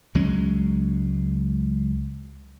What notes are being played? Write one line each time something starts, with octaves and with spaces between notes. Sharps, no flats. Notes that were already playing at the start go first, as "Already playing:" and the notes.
C#2 F#3 G#3 C#4